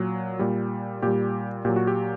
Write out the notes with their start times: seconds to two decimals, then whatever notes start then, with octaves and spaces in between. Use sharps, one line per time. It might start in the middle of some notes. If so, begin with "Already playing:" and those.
Already playing: A#2 F#3
0.39 A#2 G3
1.02 A#2 G3 G4
1.65 A#2 F#3 G4
1.76 F#4
1.87 G4